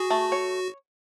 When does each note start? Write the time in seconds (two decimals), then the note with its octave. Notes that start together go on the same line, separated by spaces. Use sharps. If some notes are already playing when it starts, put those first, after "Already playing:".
Already playing: F#4 G#4
0.10 A3
0.32 C#5